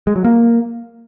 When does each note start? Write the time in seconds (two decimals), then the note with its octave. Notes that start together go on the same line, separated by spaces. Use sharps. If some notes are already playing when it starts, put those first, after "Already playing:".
0.07 G#3
0.16 F#3
0.24 A#3